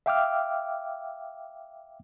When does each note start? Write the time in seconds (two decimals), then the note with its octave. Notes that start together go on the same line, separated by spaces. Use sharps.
0.06 E5 F5 G5 D6 E6 F6